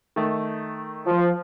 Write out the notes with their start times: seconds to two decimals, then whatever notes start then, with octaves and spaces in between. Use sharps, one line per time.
0.16 D#3 A3
1.07 F3